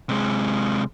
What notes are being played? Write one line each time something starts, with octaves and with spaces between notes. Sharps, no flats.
C3 G#3